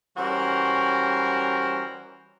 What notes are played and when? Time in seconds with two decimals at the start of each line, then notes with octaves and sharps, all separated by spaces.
0.17 E3 G3 C#4 F#4 A#4 C5